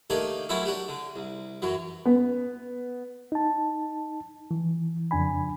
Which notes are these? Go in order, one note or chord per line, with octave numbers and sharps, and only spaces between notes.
D#3 A3 A#3 D4 G4 G#5
F#3 A3 C4 C#4 E4 E5
D4 F#4 G4
D3
C2
F#2 E3 F#3
B3
D#4 A5
E3
F2 C#3 D4 G#5 B5